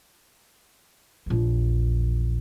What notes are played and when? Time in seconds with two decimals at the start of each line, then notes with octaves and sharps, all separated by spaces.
1.26 A#1 E2